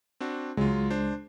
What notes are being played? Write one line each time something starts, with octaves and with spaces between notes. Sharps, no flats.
C4 D4 F#4
C#2 F#3 G#3 F4
D4 C5